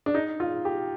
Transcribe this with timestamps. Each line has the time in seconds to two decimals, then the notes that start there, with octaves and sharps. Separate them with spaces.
0.06 D4
0.14 D#4
0.40 F4
0.65 G4